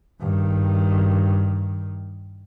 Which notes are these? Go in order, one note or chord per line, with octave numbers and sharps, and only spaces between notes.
G2 D#3